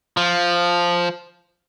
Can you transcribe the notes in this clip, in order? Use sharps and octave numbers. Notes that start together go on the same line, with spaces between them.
F3